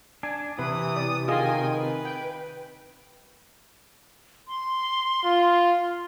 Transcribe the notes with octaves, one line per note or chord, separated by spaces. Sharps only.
D4 G#5
C3 E3 B4 D#6
D5
D#3 F4 G#4 D#5 G5 G#5
B4
G5
C6
F4